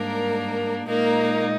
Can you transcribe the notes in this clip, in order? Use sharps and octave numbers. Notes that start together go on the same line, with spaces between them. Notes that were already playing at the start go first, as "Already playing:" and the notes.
Already playing: G#2 G3 A#3 D4 A#4
A#2 G#3 A#3 D#4 A#4